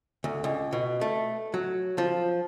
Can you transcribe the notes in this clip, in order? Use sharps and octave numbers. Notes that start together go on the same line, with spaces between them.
D2
C#2
B2
A3
F#3
F3